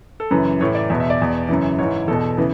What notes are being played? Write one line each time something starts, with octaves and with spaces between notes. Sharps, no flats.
A4
F#2 C#3 E3 B4
A2 E3 C#5
D5
E2 B2 E5
E5
D5
E2 B2
F#2 C#3 E3
G#2 E3 C#5
E2 B2 A4
C#3 E3 B3